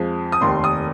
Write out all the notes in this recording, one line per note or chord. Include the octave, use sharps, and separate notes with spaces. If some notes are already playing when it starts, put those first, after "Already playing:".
Already playing: F2 F3 G#3
D#6
F1 D#2 D#3 C6
D#6